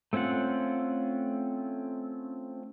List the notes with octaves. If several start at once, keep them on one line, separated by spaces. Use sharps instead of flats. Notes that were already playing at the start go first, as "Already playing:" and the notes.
A3 C4 C#4 F4 F#5